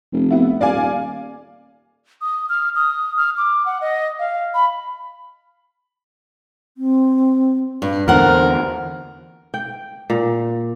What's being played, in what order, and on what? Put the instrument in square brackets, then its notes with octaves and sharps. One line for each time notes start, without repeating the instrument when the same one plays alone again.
[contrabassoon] F1
[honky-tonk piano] B3 E4
[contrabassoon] D#1 [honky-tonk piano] D5 F5 G#5
[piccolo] D#6
F6
D#6
F6
D6
F#5
D#5
F5
B5
[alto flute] C4
[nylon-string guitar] G2 [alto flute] D4
[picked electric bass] E2 D3 [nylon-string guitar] F4 F#5 [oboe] A#4 [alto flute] C5
[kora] G5
A#2